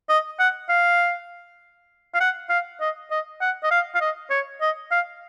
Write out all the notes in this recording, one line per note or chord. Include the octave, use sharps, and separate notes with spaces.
D#5
F#5
F5
F5
F#5
F5
D#5
D#5
F#5
D#5
F5
F5
D#5
C#5
D#5
F5